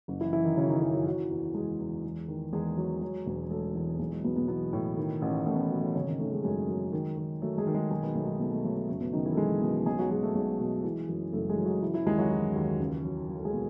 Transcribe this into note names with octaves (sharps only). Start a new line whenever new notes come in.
F#1
E3 E4
E3 E4
D#3 D#4
F#2 C#3 C#4
D#3 D#4
E3 E4
F#3 F#4
E3 F#3 F#4
E2
E2 G#3 G#4
E2
E2
D#3
E2 G#3 G#4
F#3
F#3
E1
F#3 A3 A4
E2
B1 G#3 G#4
F#3 F#4
B1 B2 B3
B2 B3
B2 E3 B3
A2
D#3
A1
A1 A3
B3
A3
F#3
A3
G#1 C#3 C#4
D#3 D#4
D#3 A3 A4
G#3 G#4
F#2 G#3 G#4
F#3
D#3
D#3
F#3 A3 A4
G#3 G#4
D#3
G#3 G#4
B1 G#3 G#4
B2 B3
B1 A3
G#3
B2 A3
A3
F#3 A3
A3
F#1 A3
B2 B3
F#1 D#3 D#4
E3 E4
A4
B2 G#3 G#4
B2
B1 G#3 G#4
F#3 F#4
F#3 G#3 G#4
A3 A4
B1 G#3 G#4
B2
E3
F#2
F#1 A3 A4
G#3 G#4
F#2
F#3 F#4
E3 E4
E3 E4
D#2 G#3 G#4
F#3 F#4
E3 E4
D#2
C#2
F#3
F#3
A4
G#3 G#4
B2